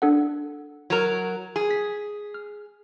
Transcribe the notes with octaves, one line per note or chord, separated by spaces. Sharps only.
D4 A4 F#5
F#3 A#4
G#4
B6
F6